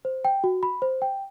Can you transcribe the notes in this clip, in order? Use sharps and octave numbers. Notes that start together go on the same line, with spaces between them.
C5
G5
F#4
B5
C5
G5